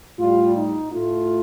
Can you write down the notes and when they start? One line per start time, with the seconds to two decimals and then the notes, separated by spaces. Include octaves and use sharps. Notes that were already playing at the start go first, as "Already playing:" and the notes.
0.19 A2 G3 F4
0.56 D#4
0.92 A2 A3 F4